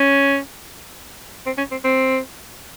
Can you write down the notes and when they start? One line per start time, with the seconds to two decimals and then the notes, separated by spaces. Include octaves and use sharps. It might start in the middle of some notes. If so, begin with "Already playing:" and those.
Already playing: C#4
1.46 C4
1.58 C#4
1.71 C4
1.84 C4